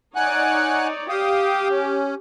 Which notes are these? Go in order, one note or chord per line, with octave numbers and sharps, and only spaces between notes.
D#4 C#5 D5 F#5 G#5 F#6
G4 F5 G5 D#6
C#4